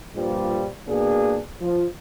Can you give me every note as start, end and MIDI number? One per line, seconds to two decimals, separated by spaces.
0.15 0.68 43
0.15 0.68 46
0.15 0.68 53
0.15 0.68 55
0.88 1.40 47
0.88 1.40 58
0.88 1.40 62
0.88 1.40 68
1.61 1.86 53